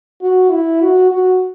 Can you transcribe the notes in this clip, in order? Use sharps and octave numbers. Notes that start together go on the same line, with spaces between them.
F#4
E4
F#4
F#4